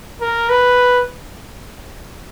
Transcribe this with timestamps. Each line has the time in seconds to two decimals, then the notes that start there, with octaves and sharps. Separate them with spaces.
0.21 A#4
0.49 B4